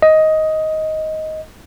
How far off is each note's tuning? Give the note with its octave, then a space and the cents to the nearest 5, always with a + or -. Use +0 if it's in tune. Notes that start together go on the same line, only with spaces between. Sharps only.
D#5 +10